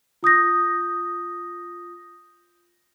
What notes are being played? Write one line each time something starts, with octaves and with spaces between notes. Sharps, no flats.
F4 D#6 G6 A#6